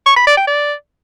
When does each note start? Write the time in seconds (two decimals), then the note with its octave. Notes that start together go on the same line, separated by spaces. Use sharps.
0.06 C#6
0.16 B5
0.27 D5
0.37 G5
0.47 D5